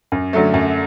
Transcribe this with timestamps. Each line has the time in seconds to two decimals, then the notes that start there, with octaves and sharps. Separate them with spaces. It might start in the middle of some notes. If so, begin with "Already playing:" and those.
0.12 F#2
0.33 D3 F#3 A3
0.54 F#2